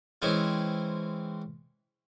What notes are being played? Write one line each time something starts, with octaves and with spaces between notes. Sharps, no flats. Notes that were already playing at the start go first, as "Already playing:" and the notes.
E3 G#3 C4 C#4